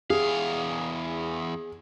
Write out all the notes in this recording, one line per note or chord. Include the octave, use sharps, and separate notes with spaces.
E2 G#4 F5